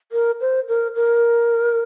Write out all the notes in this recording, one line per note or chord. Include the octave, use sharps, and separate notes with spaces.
A#4
C5
A#4
A#4